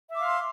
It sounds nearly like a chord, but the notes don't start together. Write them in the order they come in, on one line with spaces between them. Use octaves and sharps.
E5 D6 F5 C6